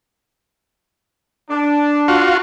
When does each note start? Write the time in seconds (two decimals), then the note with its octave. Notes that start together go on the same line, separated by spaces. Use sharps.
1.50 D4
2.08 F4 F#4